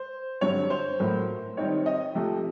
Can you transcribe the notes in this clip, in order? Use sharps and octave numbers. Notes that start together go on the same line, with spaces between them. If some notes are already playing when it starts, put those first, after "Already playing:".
Already playing: C5
G2 D3 F#3 C#5
C5
A2 F#3 A#3
D#3 G3 C4 D#4 C#5
D#5
C3 F3 A3